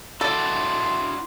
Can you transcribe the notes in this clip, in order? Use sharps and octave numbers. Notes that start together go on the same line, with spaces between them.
E4 F#4 A4 D5 C6